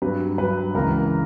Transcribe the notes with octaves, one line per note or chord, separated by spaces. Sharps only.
G2 F#3 B4
G2 F#3 B4
C#2 C#3 E3 A#4